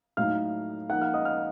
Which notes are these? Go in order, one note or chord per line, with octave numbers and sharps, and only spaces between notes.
A2 F#3 A3 D#4 F5 F6
F3 A#3 D#4 F#5 F#6
F5 F6
D#5 D#6
F5 F6